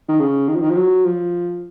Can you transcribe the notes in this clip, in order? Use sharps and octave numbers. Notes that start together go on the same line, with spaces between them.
D#3
C#3
D#3
F3
D#3
F3
F#3
F3